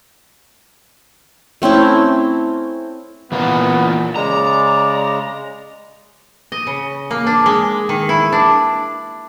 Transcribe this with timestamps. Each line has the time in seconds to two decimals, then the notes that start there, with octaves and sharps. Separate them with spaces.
1.62 A3 C4 C#4 E4
3.32 A#2 E3 A#3 B3 F4
4.16 C#3 G#3 D5 A#5
6.52 D#5
6.67 C#3
7.11 A#3
7.27 D4
7.46 G#3
7.89 D#3
8.09 E4
8.32 D4